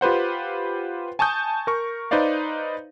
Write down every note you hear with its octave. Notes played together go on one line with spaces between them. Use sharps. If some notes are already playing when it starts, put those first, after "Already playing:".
F4 G4 B4 C5 F#5
G#5 A5 C#6 D#6 G6
A#4 C#6
D#4 B4 C5 D5 F5